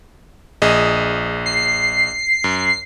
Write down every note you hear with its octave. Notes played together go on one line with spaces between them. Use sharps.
A#1 G#4 D#5
C7
F#2